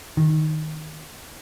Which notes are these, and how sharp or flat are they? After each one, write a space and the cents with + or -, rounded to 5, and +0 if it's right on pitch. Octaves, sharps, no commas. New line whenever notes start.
D#3 -5